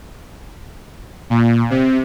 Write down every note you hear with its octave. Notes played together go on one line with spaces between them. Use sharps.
A#2
C3